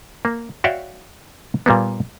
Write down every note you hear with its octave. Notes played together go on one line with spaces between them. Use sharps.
A#3
F#4 C#5 D5 E5 F5 G5
A#2 G3 A#3 B3